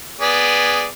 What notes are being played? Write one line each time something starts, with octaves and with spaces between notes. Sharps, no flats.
B3 G#4 D5